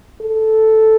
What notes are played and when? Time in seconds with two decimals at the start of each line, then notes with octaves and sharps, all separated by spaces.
0.21 A4